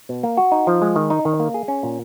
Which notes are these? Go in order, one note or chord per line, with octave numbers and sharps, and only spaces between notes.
B2
A#3
F#4
D#4
F3
G#3
D#3
D#4
D#3
A#3
G#4
C#4
A#2